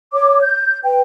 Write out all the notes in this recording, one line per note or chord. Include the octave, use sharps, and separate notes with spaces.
C#5 D6
G6
B4 G5